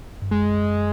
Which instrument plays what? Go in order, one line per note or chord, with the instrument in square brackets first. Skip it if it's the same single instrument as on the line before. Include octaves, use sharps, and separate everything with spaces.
[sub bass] G2
[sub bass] F#2 [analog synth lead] G#3